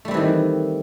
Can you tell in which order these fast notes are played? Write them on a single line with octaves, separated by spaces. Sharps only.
A3 G3 C4 E3 D#3